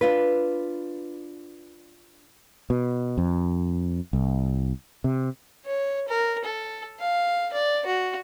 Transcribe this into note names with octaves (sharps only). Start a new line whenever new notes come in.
D4 F4 B4
B2
F2
C2
C3
C#5
A#4
A4
F5
D5
F#4